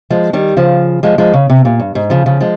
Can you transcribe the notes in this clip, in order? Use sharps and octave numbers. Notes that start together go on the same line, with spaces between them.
F3 G#3
D#3 G3
C#3 F3
F3 G#3
F3 G#3
C#3
C3
A#2
G2
G#2
C#3 F3
C#3 F3
F3 G#3